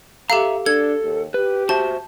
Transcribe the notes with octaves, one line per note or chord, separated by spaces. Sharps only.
G4 A4 E5 F5 A#5
D4 A4 G#6
D#2
G4 B4
F#4 C5 E5 A5